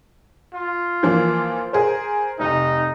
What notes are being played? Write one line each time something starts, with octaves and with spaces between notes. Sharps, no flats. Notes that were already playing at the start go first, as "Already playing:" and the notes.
F4
E3 F3 A#3
G#4 A#4 C5
F1 D#4